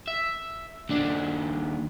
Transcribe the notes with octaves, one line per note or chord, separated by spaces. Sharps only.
E5
D#2 D4